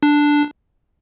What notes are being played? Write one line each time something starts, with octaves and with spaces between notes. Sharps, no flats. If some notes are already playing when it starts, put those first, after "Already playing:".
D4